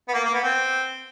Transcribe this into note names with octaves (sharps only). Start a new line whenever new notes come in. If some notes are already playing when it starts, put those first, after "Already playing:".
B3
A#3
A#3
B3
C4